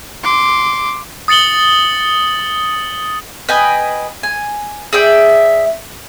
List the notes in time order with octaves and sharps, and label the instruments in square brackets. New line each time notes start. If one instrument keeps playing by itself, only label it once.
[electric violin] C6 D6
[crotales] D#6 A6 C#7 F#7 G7
[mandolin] B4 D#5 G5 G#5
G#5
G#4 D5 E5 G5